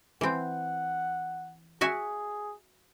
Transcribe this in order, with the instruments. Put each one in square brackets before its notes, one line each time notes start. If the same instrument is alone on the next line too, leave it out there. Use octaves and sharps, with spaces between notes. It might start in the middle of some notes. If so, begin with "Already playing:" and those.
[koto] E3 C4 [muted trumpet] F#5
[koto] F#4 E5 G#5 [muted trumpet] G#4